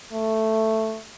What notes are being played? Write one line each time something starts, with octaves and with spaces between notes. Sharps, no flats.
A3